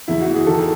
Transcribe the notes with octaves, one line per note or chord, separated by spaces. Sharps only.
E2 E4
F#4
E3
G#4
D#3 A4